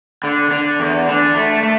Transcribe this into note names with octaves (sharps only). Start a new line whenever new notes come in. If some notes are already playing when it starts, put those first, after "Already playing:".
D3
D3
E2
D3
A3
A3